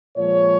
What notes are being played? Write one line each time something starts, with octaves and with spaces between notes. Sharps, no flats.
A#2 F3 G#3 C#5